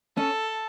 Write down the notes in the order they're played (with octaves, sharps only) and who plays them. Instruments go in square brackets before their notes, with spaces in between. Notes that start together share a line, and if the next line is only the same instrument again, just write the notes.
[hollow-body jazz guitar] C#4 [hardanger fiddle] A4